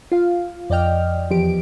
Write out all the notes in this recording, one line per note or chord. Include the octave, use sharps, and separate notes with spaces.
F4 F5
F2 D5 D#5 G5 F6
E2 F3 G4 D7